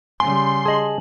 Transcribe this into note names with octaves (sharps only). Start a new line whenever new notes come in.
C#3 G3 G#5 C6
G#4 D#5 A5 F#7